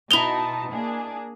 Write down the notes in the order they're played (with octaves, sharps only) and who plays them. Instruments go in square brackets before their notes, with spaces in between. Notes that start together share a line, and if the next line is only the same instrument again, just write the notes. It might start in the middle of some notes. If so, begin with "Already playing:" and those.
[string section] B2 D#4 A5 [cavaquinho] E4 D#5 [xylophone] F7 G7
[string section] A#3 D4 G#4